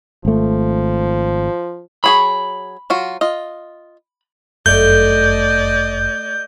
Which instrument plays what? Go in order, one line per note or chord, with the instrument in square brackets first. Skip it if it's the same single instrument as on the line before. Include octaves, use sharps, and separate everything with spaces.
[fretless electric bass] G#1 A3 [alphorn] F3
[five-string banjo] F#3 G#4 C#5 [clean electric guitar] B5
[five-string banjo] F#3 F4 F#4
F4 D#5
[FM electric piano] G1 F#2 [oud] A3 [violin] D5 D#5 [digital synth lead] G6